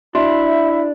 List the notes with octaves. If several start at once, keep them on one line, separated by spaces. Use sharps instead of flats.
D4 E4 F#4 E5